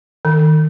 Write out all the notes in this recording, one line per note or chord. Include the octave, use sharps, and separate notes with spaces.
D#3